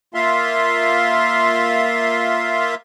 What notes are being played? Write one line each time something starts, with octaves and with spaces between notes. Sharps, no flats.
A#3 F4 E5 F5 C6